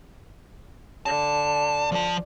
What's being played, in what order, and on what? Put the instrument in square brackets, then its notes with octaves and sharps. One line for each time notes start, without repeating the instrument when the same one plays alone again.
[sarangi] D3 [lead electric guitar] A5
[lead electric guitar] F3 A5